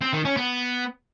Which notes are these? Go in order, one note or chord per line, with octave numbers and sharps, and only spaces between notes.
C4
D#3
C#4
B3